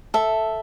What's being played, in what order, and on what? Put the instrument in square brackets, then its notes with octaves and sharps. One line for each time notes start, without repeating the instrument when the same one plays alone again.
[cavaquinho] A4 E5